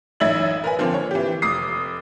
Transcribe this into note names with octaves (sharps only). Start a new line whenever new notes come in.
A1 F#2 D#4 E5 G#6 F#7
A#4 B4 G#5
D3 F3 A#3 C4
C#5
E3 G4
F1 D6 D#6 C7